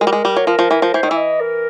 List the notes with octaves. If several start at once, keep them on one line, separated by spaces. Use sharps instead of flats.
G#3 A#4
G3
G#3
G3
F#3
F3 A#4
F3
E3
F3
E3 C5
D#3
E3 E5
D#5
A#4